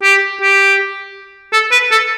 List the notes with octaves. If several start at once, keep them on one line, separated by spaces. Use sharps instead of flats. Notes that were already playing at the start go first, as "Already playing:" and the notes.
G4
G4
A4
B4
A4